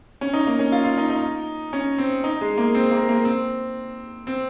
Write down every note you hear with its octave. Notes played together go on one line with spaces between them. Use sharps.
C#4
D#4
A#3
C#4
F4
F4
D#4
D#4
C#4
C4
D#4
G#3
A#3
C4
A#3
A#3
C4
C4